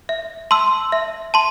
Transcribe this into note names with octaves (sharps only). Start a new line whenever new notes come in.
E5
A5 C6 E6
E5
A5 C6